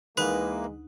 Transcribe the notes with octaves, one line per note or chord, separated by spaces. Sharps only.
D2 E3 G#3 A#3 D#4 B4